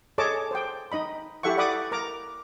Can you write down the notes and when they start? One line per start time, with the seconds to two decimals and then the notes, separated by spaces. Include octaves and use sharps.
0.18 G#4 A4 C#5 D#5 A5 D6
0.51 C5 G5
0.92 D#4 D#5 B5
1.43 E4 G4 A4 E5 F#5 C#6
1.57 D5 F#5 B5 D6 D#6
1.92 A#4 A#5 D6